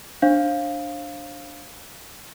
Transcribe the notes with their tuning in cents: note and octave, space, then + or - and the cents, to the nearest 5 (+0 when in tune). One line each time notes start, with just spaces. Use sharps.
D4 +0 C5 +35 F5 +0